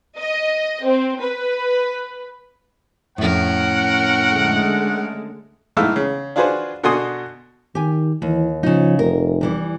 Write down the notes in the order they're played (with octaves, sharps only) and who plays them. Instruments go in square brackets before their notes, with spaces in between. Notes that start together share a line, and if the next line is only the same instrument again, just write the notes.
[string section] D#5
C4
B4
[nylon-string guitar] F2 A2 [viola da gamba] C#4 A#4 [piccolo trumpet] F#5
[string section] D3 G#3 A3
[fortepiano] B1 G#2 E3 A3 E5 F5
C#3
D4 F4 F#4 G#4 B4 C5
B2 D3 F#4 G#5 C6 D#6
[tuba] D#3 [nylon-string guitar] G4 G#5
[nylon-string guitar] D#2 [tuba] E3
[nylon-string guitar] C#3 D#4 [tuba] F3
[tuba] F1 [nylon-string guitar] A#4
[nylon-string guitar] E2 E3 G3